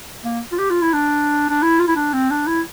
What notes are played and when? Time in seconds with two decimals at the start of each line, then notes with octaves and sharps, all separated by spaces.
0.24 A#3
0.52 F4
0.59 G4
0.70 F4
0.82 E4
0.93 D4
1.49 D4
1.62 E4
1.79 F4
1.88 E4
1.96 D4
2.13 C4
2.31 D4
2.47 E4